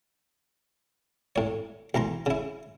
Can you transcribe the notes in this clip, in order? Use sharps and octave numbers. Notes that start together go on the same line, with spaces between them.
A2 C#5
B1 E3 A#5 C6
C#3 E4